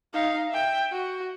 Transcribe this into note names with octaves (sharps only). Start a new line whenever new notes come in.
D#4 F5
E5 G5
F#4